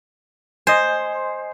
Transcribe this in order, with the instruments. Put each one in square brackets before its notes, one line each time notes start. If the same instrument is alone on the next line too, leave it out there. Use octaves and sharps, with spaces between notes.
[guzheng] C5 [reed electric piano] D#5 G#5